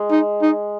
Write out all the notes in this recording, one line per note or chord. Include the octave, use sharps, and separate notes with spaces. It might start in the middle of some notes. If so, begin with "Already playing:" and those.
Already playing: G#3
D#4
D#4